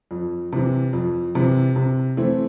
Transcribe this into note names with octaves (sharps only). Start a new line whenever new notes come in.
F2
C3 E3
F2
C3 E3
C3
E3 A3 C4 E4